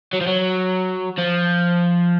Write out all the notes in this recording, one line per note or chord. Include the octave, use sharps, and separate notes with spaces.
F#3
F3
F#3
F3